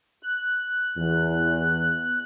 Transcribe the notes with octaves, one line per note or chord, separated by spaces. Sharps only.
F#6
E2